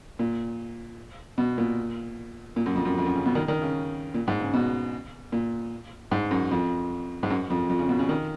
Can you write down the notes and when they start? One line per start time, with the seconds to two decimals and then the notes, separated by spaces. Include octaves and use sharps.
0.19 A#2
1.38 B2
1.58 A#2
2.56 A#2
2.66 F#2
2.75 F2
2.85 F#2
2.98 F2
3.06 F#2
3.16 C#3
3.26 B2
3.35 D#3
3.48 D#3
3.62 C#3
4.14 A#2
4.28 G#2
4.41 C#3
4.54 B2
5.32 A#2
6.11 G#2
6.31 F#2
6.51 F2
7.23 G#2
7.30 F#2
7.50 F2
7.69 F2
7.79 C#3
7.89 B2
7.99 C#3
8.09 D#3